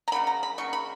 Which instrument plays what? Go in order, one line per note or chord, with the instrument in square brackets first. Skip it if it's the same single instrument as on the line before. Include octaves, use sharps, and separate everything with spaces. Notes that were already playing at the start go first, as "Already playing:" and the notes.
[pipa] A#5
C#3 F#3 A#3 B5
A#5
B5
C#3 F#3 A#3 C#6
B5